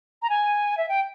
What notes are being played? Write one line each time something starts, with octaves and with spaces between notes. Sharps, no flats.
A#5
G#5
E5
G5